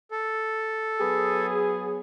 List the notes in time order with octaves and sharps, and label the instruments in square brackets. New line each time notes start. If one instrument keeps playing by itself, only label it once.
[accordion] A4
[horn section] F#3 B3 G#4